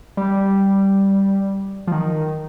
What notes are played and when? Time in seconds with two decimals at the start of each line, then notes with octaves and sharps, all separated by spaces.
0.17 G3
1.87 F3
1.92 D#3